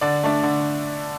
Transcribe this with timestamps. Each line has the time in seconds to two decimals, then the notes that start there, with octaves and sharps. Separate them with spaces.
0.01 D3 D5
0.24 A3 D4
0.43 D3